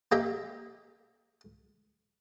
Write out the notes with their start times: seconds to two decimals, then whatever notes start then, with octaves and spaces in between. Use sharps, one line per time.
0.12 A#3 G4 D#5 E5